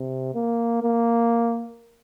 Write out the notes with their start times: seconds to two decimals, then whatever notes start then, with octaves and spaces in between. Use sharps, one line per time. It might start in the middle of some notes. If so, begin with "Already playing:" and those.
Already playing: C3
0.35 A#3
0.82 A#3